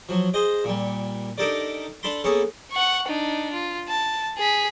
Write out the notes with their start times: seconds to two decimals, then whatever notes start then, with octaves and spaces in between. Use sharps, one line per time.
0.09 F3 F#3
0.34 G#4 C5 D#5
0.64 A#2 G3
1.38 D4 D#4 G4 A4 A#4 D5
2.03 D4 A4 A5 B5 C6
2.24 A#3 B3 C#4 G#4 A4
2.71 F#5 C#6
3.08 D4 D#4
3.52 F4
3.88 A5
4.38 G#4 B6